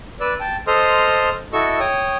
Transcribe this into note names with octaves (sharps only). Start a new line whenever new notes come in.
B4 D5 E6
G5 A5
A4 C5 D#5 C6 D#6 F6
E4 F#4 A4 D#5 C#6 E6
C#5 G5 D#6